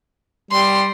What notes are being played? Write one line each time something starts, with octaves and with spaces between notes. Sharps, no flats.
G3 C6